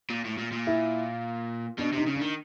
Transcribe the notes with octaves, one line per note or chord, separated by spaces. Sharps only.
A#2
A2
A#2
A#2
E4
B2 D4
C3 D#4
C#3
D4
D#3